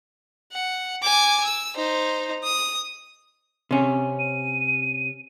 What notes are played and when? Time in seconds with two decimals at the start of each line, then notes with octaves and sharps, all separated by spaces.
0.53 F#5
1.02 G#5 D6
1.44 E6
1.76 D#4 C5
2.43 D#6
3.71 C3 C#4
4.19 D#7